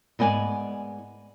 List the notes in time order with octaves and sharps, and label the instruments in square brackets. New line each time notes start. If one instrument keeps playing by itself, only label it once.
[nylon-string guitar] G#2 B3 D5 G5 G#5